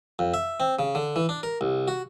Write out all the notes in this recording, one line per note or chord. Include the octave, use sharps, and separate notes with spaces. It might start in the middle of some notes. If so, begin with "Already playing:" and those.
F2
E5
C4
C#3
D3
E3
D4
A#4
C2
F#4